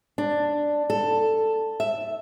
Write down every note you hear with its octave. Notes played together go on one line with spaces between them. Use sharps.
D4
A4
E5